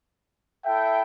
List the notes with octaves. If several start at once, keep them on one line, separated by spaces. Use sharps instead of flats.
E4 A4 E5 G5